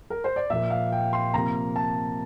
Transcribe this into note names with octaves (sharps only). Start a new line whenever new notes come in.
A#4
C5
D5
A#2 F3 A#3 E5
F5
G5
C6
C3 F3 A#3 A#5
A5